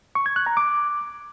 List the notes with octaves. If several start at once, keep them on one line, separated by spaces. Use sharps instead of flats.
C#6
G#6
F#6
A#5
D6